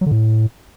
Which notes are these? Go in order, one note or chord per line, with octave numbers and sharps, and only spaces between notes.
F#3
D3
A2